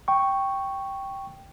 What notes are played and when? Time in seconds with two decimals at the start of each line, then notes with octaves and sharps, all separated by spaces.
0.08 G5 C#6